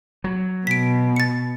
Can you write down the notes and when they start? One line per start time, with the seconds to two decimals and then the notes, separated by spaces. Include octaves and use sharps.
0.24 F#3
0.67 B2 B6 D7
1.16 A6 C#7